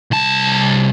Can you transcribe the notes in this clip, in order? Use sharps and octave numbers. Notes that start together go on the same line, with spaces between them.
C2 A5